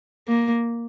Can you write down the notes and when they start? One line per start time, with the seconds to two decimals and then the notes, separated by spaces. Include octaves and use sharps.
0.28 A#3